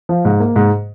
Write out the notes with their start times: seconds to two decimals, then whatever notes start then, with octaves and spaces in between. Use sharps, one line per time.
0.09 F3
0.25 G#2
0.40 A#3
0.56 G#2